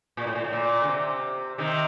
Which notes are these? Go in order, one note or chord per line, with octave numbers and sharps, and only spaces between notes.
A#2
A2
A#2
A2
A#2
D3
C3
C3 D#3